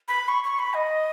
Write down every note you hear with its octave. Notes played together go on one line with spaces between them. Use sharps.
B5
C#6
C#6
B5
D#5